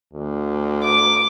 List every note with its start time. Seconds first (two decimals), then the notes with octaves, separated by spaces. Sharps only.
0.13 D2
0.83 D6